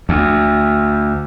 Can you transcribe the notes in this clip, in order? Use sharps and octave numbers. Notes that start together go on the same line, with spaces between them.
D2